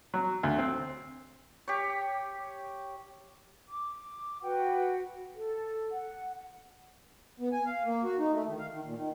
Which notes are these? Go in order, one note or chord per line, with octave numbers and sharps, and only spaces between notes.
F#3
D2
C4
G4 C#5
D6
F#4 B4 F#5 G5
A4
F#5
B3
G#5
F5
A#3
F#4
D#4
A3
D#3
F5
D#3
A#2
D#3